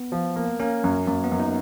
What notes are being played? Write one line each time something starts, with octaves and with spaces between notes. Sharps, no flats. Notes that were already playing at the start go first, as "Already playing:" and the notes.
Already playing: B3
F3
A#3
A#3 C#4
F#2
F#2 A#3
B3
F#2
D#4